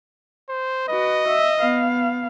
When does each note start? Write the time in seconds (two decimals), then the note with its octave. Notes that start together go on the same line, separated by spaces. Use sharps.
0.49 C5
0.89 F#4 B4 D#5
1.28 E5
1.58 B3 F5